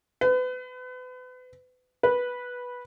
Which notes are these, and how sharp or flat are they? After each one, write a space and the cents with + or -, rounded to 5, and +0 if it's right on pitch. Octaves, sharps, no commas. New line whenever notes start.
B4 +35
B4 -10